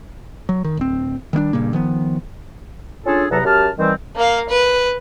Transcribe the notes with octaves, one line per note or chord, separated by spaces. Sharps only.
F#3
D#3
D1 C4
D#3 G3 A#3 D4
G2 A#2 C#3 A#3
D#3 F3 B3
C#4 D4 F4 G#4 A4
E2 C3 F#3 B3 A4 A#5
F#2 G4 A5 F6
D#3 E3 G3 C4
A#3 F5
B4